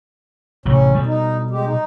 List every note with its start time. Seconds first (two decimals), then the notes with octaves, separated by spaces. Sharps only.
0.66 A1 C3 C#4
0.95 B2 G3
1.06 D#4
1.50 G#3 G4
1.66 D#4